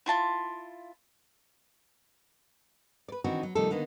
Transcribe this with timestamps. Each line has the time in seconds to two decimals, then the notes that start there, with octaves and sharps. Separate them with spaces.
0.06 E4 F4 A5 C6
3.08 B4 D5
3.24 D#3 E3 C4 D4 F#4
3.43 F#3
3.55 C3 D#3 F3 G3 A3 A4
3.71 D3 D#3 A#3 B3